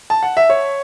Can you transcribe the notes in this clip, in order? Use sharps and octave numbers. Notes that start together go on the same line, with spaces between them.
A5
F#5
E5
C#5